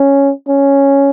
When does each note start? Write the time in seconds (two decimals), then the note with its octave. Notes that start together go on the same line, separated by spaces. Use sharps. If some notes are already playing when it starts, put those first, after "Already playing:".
Already playing: C#4
0.48 C#4